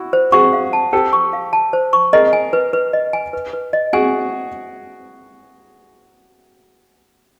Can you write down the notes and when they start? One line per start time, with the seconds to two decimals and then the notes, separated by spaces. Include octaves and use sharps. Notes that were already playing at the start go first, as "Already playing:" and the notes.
Already playing: E4 F#4
0.13 C5
0.32 F#4 G#4 C#6
0.53 F5
0.73 A5
0.93 G4 A4 C5
1.13 C#6
1.33 F5
1.53 A5
1.73 C5
1.93 C#6
2.13 G#4 A#4 D#5
2.33 G#5
2.53 B4
2.73 B4
2.93 D#5
3.13 G#5
3.33 B4
3.53 B4
3.73 D#5
3.93 F#4 G#4 G#5